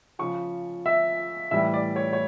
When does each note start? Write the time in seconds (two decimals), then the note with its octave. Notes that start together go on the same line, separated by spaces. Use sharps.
0.19 C#3 F3 C#6
0.86 E5
1.51 A2 E3 G3 E5
1.74 D5
1.96 C#5
2.13 C#5